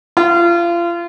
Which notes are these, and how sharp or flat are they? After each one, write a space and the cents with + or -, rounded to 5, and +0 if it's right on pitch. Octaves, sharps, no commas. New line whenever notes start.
F4 -30